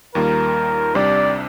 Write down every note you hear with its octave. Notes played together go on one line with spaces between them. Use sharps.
D#2 D#3 G3 A#3 F4 A#4
C2 C3 G3 D4 D5